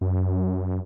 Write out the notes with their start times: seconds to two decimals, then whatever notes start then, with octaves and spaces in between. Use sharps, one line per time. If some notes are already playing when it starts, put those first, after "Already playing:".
0.01 F#2